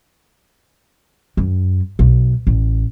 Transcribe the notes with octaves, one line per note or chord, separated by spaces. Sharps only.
F#2
B1
A1